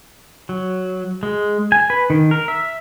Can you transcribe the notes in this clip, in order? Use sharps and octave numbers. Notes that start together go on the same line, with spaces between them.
F#3
G#3
G#5
B4
D#3
A#4
E5